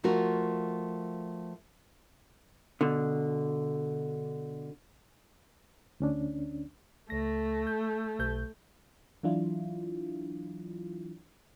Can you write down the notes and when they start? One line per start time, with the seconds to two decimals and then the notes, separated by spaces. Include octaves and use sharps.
0.04 F3 A3 F4 F#4 A#4
2.81 B2 D3
6.00 D2 C#4 D4
7.10 C#2 A3 A#6
7.67 G6
8.19 B1 G6
9.23 E3 F#3 D4 E4 F4